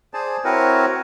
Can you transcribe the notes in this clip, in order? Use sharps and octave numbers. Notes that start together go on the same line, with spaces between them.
G#4 C5 D5 G#5 A5
C4 E4 F#4 A#4 B4 C#5